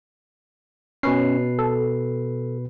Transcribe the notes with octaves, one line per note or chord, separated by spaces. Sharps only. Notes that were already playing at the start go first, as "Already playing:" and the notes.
B2 C#4 B4 C7
A4